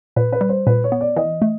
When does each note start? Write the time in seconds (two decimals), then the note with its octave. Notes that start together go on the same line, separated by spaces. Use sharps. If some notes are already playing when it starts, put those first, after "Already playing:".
0.16 A#2 B4
0.32 B4
0.41 G3
0.49 C5
0.67 A#2 B4
0.84 C#5
0.92 B3
1.01 D5
1.16 E3 D#5
1.42 A3